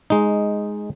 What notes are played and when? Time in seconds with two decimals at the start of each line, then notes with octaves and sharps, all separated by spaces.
0.10 G#3 D#4